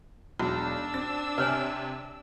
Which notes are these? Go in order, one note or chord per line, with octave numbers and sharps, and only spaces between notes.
E1 B1 D4 F#4 E6
C4 A6
C3 B4 C#5 G#5